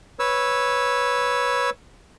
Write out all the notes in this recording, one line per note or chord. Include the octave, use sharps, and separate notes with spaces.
B4 C#5 E6